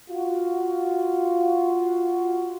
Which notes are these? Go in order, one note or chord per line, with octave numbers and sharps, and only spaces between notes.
F4 F#4